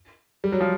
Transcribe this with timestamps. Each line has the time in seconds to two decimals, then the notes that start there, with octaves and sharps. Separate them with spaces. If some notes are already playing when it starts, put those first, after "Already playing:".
0.44 G3
0.52 F#3
0.61 F3